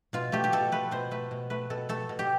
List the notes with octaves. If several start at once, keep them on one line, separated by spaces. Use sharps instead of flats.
B2 F4
A3 G4
G4
B2 A4
A3 B4
B2 C5
A3 B4
B2
A3 B4
B2 A4
A3 A4
B2
G4